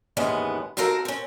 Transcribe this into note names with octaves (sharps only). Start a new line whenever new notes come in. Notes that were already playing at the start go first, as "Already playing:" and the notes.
D#2 G#2 E3 G#3 B3 C#4
D#2 C4 F#4 A4 A#4 F5
C4 C#4